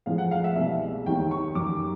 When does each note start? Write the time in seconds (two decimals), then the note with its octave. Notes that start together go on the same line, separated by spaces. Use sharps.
0.06 A2 F3 G#3 F5
0.18 F#5
0.31 F5
0.44 E5
0.56 C2 B2 G#3 E5
1.06 D#2 D#3 G3 G5
1.31 C#6
1.55 F#2 D#3 G3 D6